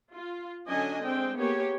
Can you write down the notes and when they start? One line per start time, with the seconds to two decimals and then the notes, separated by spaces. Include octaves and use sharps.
0.13 F4
0.67 D3 F#3 C#4 D4 D#5 G#5
1.01 G#3 C4 D4 G5
1.36 A#3 B3 G4 G#4 C#5